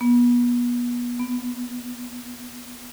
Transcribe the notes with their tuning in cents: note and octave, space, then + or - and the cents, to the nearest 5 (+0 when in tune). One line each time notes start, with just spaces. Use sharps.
B3 -30
B3 +20